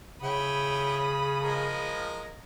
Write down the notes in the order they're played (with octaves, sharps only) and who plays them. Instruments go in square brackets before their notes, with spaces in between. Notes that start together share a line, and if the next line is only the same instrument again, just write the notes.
[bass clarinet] C#3 [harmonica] E4 C#5 G5 [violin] B5 D#6
[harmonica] F3 G#3 A#4